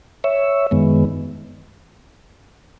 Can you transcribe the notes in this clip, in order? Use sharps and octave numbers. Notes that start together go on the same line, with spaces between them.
C#5 E5
F#2 D#3 G#3 B3